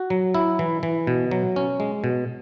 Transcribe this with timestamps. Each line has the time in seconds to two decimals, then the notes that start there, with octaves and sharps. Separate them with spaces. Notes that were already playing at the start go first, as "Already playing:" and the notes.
Already playing: F#4
0.10 F#3
0.34 E4
0.59 E3
0.83 E3
1.07 B2
1.31 F#3
1.56 C#4
1.80 G#3
2.04 B2